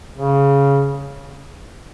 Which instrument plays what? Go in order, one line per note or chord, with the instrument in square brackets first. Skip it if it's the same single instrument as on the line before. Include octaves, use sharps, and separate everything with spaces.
[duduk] C#3